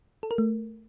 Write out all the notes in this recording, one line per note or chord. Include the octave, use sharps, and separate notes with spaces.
A4
A#4
A3